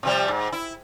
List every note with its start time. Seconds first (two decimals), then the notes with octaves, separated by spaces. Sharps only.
0.03 C3 F3 G3
0.28 G#2
0.52 E4